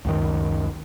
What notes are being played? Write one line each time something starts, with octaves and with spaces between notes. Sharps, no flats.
C#2 F#2 D#3